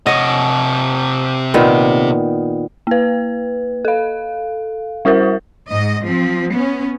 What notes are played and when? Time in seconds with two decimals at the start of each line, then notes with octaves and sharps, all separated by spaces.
0.06 C3 C#5 D#5 F#5
1.54 A#2 D#3 B3
2.87 A#3 B4
3.85 A4 F5
5.05 G3 E4 F#4 A#4 C5
5.69 G#2 D#5
6.03 F3 C4
6.52 B3 C#4